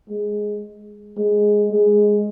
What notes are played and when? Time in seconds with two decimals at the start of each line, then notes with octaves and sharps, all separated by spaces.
0.09 G#3
1.17 G#3
1.71 G#3